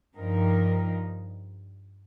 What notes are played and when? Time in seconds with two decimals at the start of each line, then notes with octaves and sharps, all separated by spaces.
0.14 G2 F3 D#4 A#4